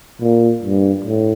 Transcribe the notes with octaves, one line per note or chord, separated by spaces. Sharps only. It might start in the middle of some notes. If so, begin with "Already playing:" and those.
A#2
G2
A2